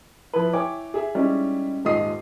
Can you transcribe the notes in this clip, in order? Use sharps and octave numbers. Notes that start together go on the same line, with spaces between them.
F3 E4 B4
E4 C#5 G5 G#5 D6
G#4 E5
G3 G#3 C#4 D#4 E4
D#1 G#2 F4 D#5 D#6 C7